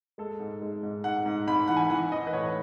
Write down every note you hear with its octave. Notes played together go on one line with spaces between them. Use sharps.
G#3 A4
G#2
G#3
G#2
G#2 F#5
G#2
G#2 B5
E3 F#5
G#5
E3 F#5
E3 D#5
B4
A2 C#5